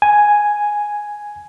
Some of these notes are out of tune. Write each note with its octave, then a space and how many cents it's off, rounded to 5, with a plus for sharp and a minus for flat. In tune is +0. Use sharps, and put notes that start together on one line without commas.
G#5 +0